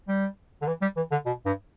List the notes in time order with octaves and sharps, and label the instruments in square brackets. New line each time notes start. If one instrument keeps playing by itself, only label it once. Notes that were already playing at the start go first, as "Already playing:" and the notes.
[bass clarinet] G3
D3
E3
G3
E3
D3
B2
G2